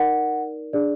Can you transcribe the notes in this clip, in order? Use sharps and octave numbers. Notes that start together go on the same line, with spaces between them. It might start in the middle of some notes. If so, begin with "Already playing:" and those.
Already playing: D#4 A#4 D5 F#5
D4 G#4 D5